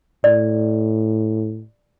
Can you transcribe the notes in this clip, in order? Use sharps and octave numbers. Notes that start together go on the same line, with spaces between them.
A2 D5